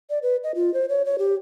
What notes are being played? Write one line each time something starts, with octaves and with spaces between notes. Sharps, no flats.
D5
B4
D#5
F4
C5
C#5
C#5
G4